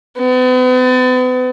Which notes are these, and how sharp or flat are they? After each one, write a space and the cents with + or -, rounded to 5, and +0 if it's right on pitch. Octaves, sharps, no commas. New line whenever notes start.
B3 +40